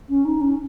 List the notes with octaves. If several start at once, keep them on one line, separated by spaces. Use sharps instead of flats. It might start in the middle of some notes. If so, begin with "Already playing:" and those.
C#4
D#4
C#4